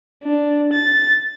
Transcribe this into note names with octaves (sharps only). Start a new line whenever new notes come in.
D4
A6